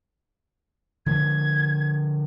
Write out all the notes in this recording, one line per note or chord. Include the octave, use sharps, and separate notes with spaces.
D3 F3 G#3 G#6